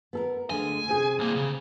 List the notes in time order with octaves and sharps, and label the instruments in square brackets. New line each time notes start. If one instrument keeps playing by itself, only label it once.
[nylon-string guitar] B3 A4 A#4
[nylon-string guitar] D2 D3 G#3 [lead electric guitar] G#5
[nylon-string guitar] C3 C4 G#4
[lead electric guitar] C2 A#3
C#3